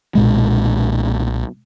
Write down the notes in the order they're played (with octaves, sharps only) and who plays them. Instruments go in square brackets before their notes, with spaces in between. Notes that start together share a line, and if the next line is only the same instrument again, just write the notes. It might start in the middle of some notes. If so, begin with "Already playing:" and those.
[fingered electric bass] B1 A#2 G#3